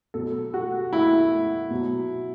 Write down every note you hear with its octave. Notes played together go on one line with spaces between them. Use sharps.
B2 F#3 A4
F#4
E4
B2 F#3